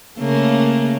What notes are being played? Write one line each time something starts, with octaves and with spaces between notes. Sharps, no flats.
C#3 A3 A#3